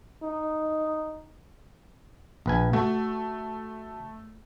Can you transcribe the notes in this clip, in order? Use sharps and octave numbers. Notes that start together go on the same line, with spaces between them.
D#4
A#1 B4 G#5
A3 F#4